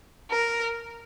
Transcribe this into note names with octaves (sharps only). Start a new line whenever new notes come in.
A#4